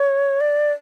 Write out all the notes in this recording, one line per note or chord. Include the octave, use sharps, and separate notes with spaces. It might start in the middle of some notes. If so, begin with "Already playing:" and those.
Already playing: C#5
D5